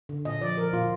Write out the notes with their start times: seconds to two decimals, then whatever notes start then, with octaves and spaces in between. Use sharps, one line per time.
0.09 D3
0.25 A#2 D#5
0.42 F3 D5
0.57 F3 A#4
0.73 A#2 F4